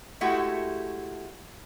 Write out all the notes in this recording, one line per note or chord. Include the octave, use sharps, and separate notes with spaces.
G#3 A3 E4 F#4 G4